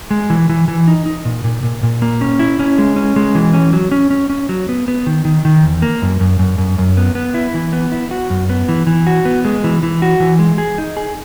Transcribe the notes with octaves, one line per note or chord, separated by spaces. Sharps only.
G#3
E3
E3
E3
D#4
D#4
A#2
A#2
A#2
A#2
A#3
C#4
E4
C#4
G#3
C#4
G#3
E3
C#4
F#3
C#4
C#4
C#4
F#3
B3
B3
D#3
D#3
D#3
E2
A#3
F#2
F#2
F#2
F#2
F#2
B3
B3
E4
E3
B3
E4
F#4
F#2
B3
E3
E3
F#4
B3
G#3
E3
E3
F#4
E3
G#3
G#4
D#4
G#4